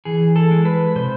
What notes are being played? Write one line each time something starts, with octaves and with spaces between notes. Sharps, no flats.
E3 G#4
A4
G#3
B4
C3 C5